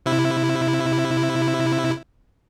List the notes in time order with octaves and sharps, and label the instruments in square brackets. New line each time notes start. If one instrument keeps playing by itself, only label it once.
[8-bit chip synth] C3 E4